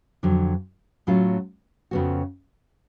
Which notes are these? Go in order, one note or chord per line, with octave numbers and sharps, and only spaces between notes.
F2 D3 F#3
A2 F#3 A3 C#4 F4
F2 C#3 F3 B3 F#4